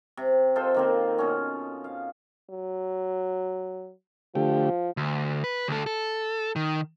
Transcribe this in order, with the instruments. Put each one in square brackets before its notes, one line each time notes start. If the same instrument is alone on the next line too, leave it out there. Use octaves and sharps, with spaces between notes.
[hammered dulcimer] C3
F4 A4 C5 D#5
D#3 A#3 C4
B2 C#4
F5
[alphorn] F#3
[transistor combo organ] D3 A3 G4 [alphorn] F3
[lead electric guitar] D2
B4
D2 A4
A4
D#3